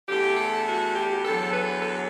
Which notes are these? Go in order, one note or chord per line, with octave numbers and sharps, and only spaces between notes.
E2 D3 A3 G4
A4
F#4
G4
E2 D3 F#3 A4
B4
A4